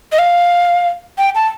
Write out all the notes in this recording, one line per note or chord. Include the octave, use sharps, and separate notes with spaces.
D#5
F5
G5
A5